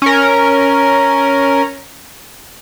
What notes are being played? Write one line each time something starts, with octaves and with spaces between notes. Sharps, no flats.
C#4 A#4